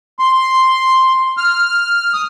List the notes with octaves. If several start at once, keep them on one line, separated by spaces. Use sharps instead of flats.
C6
F6
D#6